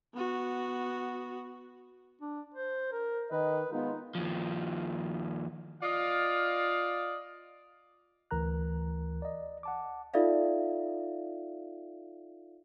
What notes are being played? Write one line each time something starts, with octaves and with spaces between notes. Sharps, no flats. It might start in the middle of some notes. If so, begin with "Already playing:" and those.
B3 F#4
D4
C5
A#4
D#3 B4 D#5
G#3 B3 D#4 F4
D#2 F3
F4 D5 D#5 F5
D2 E3 A#4 A#5 F#6
D5 D#5
F#5 A5 D6
D#4 F4 A4 D5 E5 F5